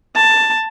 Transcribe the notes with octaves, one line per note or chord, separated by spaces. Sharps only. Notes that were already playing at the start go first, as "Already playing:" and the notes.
A5